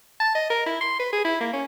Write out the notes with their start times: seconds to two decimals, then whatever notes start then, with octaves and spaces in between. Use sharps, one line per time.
0.20 A5
0.35 D#5
0.50 A#4
0.66 E4
0.81 C6
0.99 B4
1.13 G#4
1.25 E4
1.41 A#3
1.53 C#4